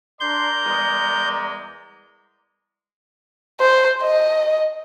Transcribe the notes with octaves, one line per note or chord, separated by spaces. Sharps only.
D4 A#4 D5 A#5 C6 G6
E2 G3 G#3
C5
D#5